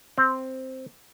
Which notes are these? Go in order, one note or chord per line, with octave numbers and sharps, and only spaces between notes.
C4